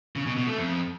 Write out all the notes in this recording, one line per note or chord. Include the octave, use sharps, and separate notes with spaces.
C#3
B2
B2
A3
F2